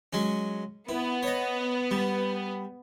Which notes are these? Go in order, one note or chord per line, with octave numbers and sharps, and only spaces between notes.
F#3 G#3 C#4
B3 E4
C#5 D#5
G3